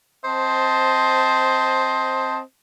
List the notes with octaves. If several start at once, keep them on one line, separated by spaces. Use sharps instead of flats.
C4 C5 D#5 A5